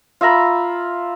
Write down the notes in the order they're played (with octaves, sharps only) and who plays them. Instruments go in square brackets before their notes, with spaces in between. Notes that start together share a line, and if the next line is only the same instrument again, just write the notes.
[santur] F4 E5 A#5 B5